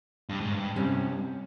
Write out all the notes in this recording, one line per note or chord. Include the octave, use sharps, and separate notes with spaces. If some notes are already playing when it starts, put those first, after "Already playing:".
G2
G#2
G2
C3 G3 C#4